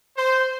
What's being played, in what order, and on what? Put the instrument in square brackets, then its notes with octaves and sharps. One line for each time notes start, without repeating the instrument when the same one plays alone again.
[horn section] C5